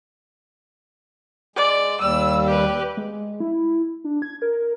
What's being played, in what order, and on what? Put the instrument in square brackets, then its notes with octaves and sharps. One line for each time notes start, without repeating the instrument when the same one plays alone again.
[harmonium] G#3 [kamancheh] D5
[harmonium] D#2 G3 [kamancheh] E6
[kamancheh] G4 B4
[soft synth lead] G#3
E4
D4
G#6
A#4